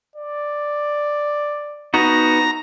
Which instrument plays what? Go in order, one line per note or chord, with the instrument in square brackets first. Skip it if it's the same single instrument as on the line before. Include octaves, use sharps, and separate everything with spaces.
[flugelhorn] D5
[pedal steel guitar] B3 D#4 F#4 [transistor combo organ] A#5